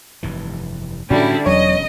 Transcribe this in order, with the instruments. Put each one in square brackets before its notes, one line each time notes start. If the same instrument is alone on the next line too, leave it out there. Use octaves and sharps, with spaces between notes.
[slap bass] F1 G2 E3
[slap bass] A2 [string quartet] D3 G3 E4 [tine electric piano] C#4 F#4
[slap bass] E1 C#4 [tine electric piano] E2 F#3 [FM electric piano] C#5 [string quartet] D#5